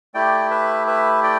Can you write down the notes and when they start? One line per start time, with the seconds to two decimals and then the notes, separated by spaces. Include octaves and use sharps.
0.14 A3 E4 G4 D5 G5
0.51 B4 E5
0.87 B4 E5
1.23 D5 G5